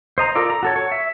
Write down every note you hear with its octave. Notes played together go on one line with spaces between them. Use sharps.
C5 D#5 A#5
F4 A4 A#4 D5
A#5
F#4 A4 C#5
C#5
E5